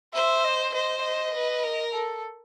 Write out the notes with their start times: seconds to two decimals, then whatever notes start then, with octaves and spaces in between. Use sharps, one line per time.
0.14 C5 E5
0.44 D#5
0.74 C5 D#5
1.03 D#5
1.34 B4
1.63 A#4
1.94 A4